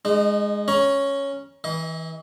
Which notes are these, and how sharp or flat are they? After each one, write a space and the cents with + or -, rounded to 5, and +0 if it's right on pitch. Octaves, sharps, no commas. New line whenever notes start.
G#3 +0 D#4 -35
C#4 +0 C#5 +0 A#5 +30
E3 -25 D#5 +30